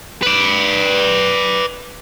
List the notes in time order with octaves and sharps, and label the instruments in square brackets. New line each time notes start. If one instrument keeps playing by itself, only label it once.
[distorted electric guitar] B4 D5